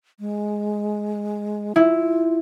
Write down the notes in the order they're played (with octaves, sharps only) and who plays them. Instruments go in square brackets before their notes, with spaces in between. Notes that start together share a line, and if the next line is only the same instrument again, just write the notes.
[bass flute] G#3
[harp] E4 [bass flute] F4